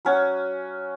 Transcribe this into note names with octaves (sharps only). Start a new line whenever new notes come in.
F#3 C#4 F#4